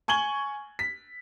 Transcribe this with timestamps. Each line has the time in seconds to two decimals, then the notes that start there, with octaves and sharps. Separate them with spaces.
0.08 G#5 C#6 G#6 F#7 G7
0.79 B6